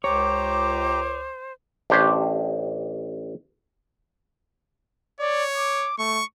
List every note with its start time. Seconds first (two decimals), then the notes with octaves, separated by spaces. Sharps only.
0.04 C#2 G4 C5 C#5 A#5 D6
1.90 A1 D4 G4 C5 C#5
5.21 C#5 D5
5.57 D6
5.99 A3 C#6